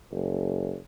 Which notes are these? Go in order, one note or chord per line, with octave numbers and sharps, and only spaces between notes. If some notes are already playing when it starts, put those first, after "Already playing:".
F#1